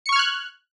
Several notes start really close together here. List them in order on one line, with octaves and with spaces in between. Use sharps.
C#7 C#6 F6 G#6 F#6